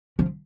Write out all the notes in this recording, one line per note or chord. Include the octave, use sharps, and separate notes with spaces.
F3